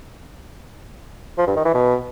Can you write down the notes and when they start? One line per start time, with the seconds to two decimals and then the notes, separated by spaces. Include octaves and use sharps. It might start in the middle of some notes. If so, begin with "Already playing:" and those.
1.38 F3
1.47 G2
1.56 D#3
1.65 E3
1.74 B2